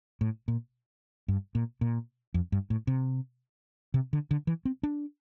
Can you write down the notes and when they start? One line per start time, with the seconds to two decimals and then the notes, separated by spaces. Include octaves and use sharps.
0.21 A2
0.48 A#2
1.28 G2
1.55 A#2
1.81 A#2
2.34 F2
2.52 G2
2.70 A2
2.87 C3
3.94 C3
4.13 D3
4.31 D3
4.47 E3
4.65 C4
4.83 D4